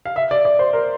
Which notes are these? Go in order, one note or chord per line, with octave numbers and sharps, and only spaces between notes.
F5
E5
D5
D5
C5
A#4